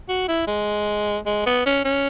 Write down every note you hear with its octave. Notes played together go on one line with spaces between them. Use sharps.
F#4
E4
G#3
G#3
B3
C#4
C#4